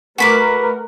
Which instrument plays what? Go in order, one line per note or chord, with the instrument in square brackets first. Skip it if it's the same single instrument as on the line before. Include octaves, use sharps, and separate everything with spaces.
[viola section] A3 A#4 [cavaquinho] F#4 B5 D6 [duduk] B4